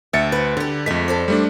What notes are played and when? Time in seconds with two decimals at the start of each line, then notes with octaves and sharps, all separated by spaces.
0.13 D2 E5 A6 C#7
0.32 B4 C5
0.57 D3 G3 G4
0.86 F2 G#3 A3 B6
1.08 A4 C5 D5
1.28 G3 A3 D4